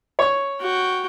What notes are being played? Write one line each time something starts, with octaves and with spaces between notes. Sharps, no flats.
C#5 C#6
F#4 G5